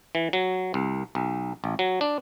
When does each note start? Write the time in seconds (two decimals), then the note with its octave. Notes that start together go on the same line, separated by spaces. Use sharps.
0.15 E3
0.33 F#3
0.74 C2
1.15 B1
1.64 A1
1.79 F#3
2.01 D4